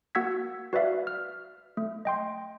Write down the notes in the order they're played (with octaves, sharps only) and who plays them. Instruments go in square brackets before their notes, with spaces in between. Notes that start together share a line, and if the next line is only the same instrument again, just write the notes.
[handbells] A#3 F#4 F#5 E6 G#6 B6
F#4 B4 D5 E5 F5
F6
A3
D#5 G5 C6